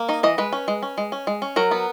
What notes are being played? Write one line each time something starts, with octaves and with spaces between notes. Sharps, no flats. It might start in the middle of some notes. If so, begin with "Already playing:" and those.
Already playing: A#3
D#4 D#5
E3 D#5
G#3 B4
C#4
G#3
C#4
G#3
C#4
G#3
C#4
F#3 A#4
B3